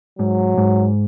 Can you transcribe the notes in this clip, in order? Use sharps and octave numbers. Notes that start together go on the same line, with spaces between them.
G#2 F#3
G#2